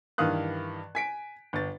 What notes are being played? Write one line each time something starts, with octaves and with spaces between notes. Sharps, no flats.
G2 D#3 E3 F5 D#6 F#6
G#5 B6 D7
G1 A6